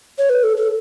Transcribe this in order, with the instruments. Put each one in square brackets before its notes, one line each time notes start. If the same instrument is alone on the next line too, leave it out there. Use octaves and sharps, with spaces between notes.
[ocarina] C#5
B4
A4
A4